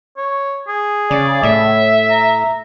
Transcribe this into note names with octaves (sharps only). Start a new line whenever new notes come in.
C#5
G#4
C#3 D5
A2 E5
A#5